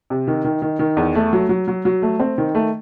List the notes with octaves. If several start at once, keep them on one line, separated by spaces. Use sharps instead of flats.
C3
D#3
D#3
D#3
D#3
E2
A3
F#3
F#3
F#3
F#3
A3
C4
D#3
A3